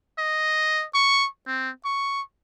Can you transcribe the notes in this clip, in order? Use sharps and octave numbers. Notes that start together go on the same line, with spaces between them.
D#5
C#6
C4
C#6